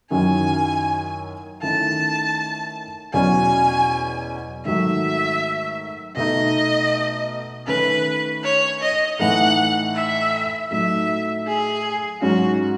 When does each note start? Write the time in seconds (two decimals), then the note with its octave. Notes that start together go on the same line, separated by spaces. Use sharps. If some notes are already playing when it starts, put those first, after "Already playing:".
0.11 F#2 D#3 F#3 C#4 E4 G#5
1.62 D#3 A3 C#4 E4 A5
3.14 E2 B2 F#3 C#4 G#5
4.65 G#2 D#3 F#3 A3 E5
6.17 B2 A3 D#4 D#5
7.67 D#3 A3 C#4 B4
8.44 C#5
8.82 D#5
9.19 A2 E3 A3 D#4 F#5
9.95 E5
10.71 A2 F#3 A3 D#4 E5
11.47 G#4
12.22 G#2 F#3 C#4 F#4